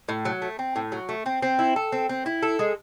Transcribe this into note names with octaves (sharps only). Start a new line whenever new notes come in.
A2
F#3
A3
C4
A2
F#3
A3
C4
C4
E4
A4
C4
C4
E4
A4
G#3